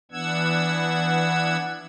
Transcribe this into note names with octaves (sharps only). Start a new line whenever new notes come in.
E3 B3 D4 F#5 E6 G#6